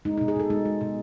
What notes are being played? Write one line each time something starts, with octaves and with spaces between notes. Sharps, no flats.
G#3 D#4
B2 D#4
G#4
B2 A4
G#3 D#4
G#3
B2